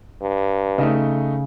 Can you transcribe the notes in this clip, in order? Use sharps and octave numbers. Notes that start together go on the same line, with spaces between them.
G2
C#3 A3 D#4